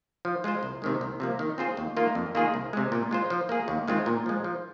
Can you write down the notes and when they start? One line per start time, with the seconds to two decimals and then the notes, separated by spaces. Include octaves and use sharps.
0.25 F3
0.44 G#3 F4 C5
0.63 C2
0.82 C3 D#3 G#3
1.01 C2
1.20 C3 F3 A#3
1.39 D#3
1.58 C4 F4 G#4 C5
1.77 D#2
1.97 D#3 A#3 F4
2.15 F2
2.35 D#3 A#3 F4 G#4
2.54 C2
2.73 C3 G#3
2.92 A#2
3.11 G#3 F4 C5
3.30 F3
3.49 A#3 G#4
3.68 D#2
3.88 D#3 G#3 C4 F4
4.06 A#2
4.26 F3 G#3
4.44 F3